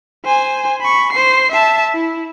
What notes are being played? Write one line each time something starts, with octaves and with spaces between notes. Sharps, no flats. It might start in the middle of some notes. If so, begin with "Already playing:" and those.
C5 G#5
B5 C#6
C5 C7
E5 A5
E4